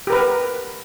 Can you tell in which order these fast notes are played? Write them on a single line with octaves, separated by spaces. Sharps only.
G4 A#4 B4